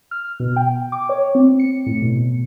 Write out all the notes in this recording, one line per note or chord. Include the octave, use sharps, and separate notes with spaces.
F6
B2
G5
D6
C#5
C4
C#7
A2
B2
B2